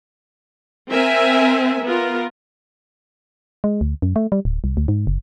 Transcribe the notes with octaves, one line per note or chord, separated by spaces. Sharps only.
C4 A#4 E5 G#5
B3 F4 A#4
G#3
D2
F#2
A3
G3
D1
C2
D2
G#2
F#1